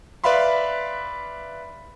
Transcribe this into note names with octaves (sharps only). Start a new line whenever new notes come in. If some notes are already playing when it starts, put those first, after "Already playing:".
B4 D5 E5 F5 B5 C6